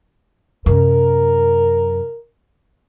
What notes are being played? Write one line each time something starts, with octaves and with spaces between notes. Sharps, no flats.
F#2 C3 A#4